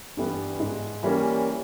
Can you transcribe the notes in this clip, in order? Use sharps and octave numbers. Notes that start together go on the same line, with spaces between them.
G2 E3 G3 B3
G#2
E3 G3 A#3 C#4